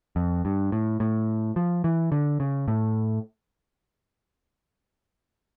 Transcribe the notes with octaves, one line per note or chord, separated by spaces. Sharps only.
F2
G2
A2
A2
F3
E3
D3
C#3
A2